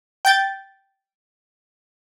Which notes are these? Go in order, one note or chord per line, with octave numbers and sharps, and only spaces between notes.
G5 G6 A6